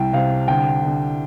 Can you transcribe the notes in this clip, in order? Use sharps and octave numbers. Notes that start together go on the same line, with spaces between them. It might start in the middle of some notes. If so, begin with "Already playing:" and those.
Already playing: C2 G5
C3 F5
D3 G5
D3